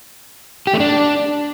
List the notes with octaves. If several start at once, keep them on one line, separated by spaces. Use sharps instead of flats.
G4
A3
D4